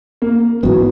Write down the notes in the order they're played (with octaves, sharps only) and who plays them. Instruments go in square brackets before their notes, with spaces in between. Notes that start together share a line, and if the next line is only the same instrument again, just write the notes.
[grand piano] A#3
[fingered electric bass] G#2 E3 B3 [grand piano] F#3